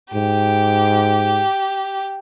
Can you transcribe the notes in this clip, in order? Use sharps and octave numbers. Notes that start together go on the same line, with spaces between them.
G#2 G4